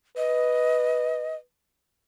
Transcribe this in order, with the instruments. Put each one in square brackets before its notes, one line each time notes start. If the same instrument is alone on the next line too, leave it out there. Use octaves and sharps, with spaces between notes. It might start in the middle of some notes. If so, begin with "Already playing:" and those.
[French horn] B4 [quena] D#5